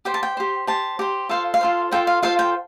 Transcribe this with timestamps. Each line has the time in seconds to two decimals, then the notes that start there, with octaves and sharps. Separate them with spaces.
0.05 G4 C5 G5
0.14 A5
0.23 G5
0.37 G4 C5
0.67 G4 C5 A5
0.99 G4 C5
1.29 F4 A4 C5 F5
1.54 F5
1.61 F4 A4 C5
1.91 F4 A4 C5 G5
2.07 F5
2.23 F4 A4 C5 F5
2.39 G5